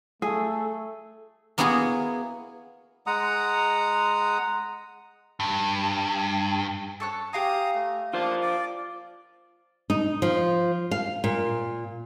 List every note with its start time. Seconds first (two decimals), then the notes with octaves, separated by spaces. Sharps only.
0.22 A3 G#4 A4
1.58 A#3 B3 E4 F#4 G#4
3.07 G#3 F#5 A#5 D#6
5.40 G2
7.00 A4 C#5 F#6
7.33 G4 F5 G#5 A#5 D#6
7.74 A3
8.13 A#3 D4 F4 C5
8.43 D5
9.90 D#4
10.22 F3
10.91 F5
11.24 A#2